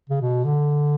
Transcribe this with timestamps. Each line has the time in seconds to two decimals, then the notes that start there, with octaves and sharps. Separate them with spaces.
0.10 C#3
0.21 B2
0.44 D3